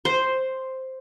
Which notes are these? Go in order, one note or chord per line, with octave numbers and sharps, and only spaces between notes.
C5